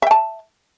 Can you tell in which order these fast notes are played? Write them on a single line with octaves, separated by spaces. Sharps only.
E5 G5 A5